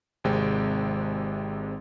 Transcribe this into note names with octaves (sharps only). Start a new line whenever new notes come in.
G#1 C3 G#3 G5